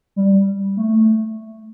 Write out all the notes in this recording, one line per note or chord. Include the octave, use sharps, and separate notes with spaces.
G3
A3